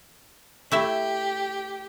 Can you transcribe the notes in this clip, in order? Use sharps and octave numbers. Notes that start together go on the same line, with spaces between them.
A3 E4 G4 E5